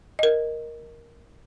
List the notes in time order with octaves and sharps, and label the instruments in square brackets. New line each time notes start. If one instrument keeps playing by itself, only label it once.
[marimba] A#4 D#5